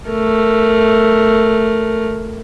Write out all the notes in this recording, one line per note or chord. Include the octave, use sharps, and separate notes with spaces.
A3 A#4